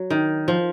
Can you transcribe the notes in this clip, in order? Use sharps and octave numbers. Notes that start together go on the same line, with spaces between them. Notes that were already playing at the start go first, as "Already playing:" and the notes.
Already playing: F#3
D#3
F3